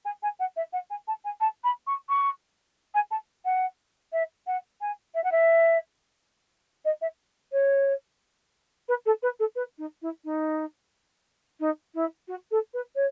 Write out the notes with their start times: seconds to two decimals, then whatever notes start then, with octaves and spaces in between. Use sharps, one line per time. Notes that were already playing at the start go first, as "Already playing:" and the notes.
0.05 G#5
0.22 G#5
0.39 F#5
0.56 E5
0.72 F#5
0.90 G#5
1.07 A5
1.24 G#5
1.40 A5
1.64 B5
1.87 C#6
2.09 C#6
2.94 G#5
3.11 A5
3.45 F#5
4.12 E5
4.46 F#5
4.81 G#5
5.14 E5
5.24 F#5
5.31 E5
6.84 D#5
7.01 E5
7.52 C#5
8.88 B4
9.05 A4
9.22 B4
9.39 A4
9.55 B4
9.78 D#4
10.02 E4
10.24 D#4
11.60 D#4
11.94 E4
12.28 F#4
12.51 A4
12.73 B4
12.95 C#5